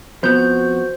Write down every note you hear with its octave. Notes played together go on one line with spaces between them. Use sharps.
F2 B3 F#4 C5 G6